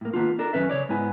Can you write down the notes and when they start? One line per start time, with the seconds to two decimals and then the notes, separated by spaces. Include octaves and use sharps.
0.01 A2 A#3
0.13 D#3 G3 A#3 B3 D4 F4
0.39 D4 A4 A#4
0.53 F#2 D#3 C#4 B4 E5
0.70 C#3 C#5 D5
0.89 G#2 B3 E4 G#5